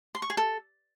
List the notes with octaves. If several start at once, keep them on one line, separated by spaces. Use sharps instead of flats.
C6
C#6
G#4
A4